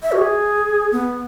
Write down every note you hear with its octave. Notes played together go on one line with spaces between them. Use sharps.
E5
F#4
G#4
B3